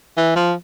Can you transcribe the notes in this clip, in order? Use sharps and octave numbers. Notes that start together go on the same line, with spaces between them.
E3
F3